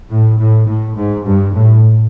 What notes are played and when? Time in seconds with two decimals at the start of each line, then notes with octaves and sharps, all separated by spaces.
0.10 A2
0.39 A2
0.67 A2
0.96 G#2
1.26 G2
1.54 A2